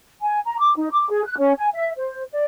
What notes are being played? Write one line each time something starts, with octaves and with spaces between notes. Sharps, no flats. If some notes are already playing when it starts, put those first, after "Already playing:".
G#5
A#5
D6
D#4
D6
G#4
F#6
C#4
G#5
E5
C5
D5